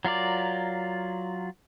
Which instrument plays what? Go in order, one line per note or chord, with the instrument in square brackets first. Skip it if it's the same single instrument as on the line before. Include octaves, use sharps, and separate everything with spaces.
[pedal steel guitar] F#3 F4 A#4 D5